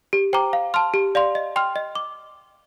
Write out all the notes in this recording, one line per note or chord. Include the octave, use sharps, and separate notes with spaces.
G4
C5 G5 A#5 D6
F5
A5 C6 F6
G4
D5 F5 C6
D#5
G5 C6 F6
D#5
D6